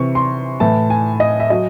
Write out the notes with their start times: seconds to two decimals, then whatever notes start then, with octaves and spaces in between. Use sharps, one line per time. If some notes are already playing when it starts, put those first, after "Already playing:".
Already playing: C3 E3 C#6
0.15 C6
0.60 A2 E3 A5
0.90 G#5
1.20 D#5
1.40 E5
1.50 F#3 D#5